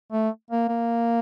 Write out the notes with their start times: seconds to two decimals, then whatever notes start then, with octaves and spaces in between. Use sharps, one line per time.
0.12 A3
0.51 A#3
0.69 A#3